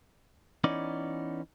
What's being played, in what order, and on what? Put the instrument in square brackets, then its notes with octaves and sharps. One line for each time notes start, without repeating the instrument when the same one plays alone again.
[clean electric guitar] E3 B3 C#4 D#4 D5